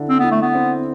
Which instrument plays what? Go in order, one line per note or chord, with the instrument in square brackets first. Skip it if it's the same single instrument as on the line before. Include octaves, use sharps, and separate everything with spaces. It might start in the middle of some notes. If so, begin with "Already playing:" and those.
Already playing: [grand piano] D3 E4
[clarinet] C4
[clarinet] B3 [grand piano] E4
[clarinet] A3
B3
[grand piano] C4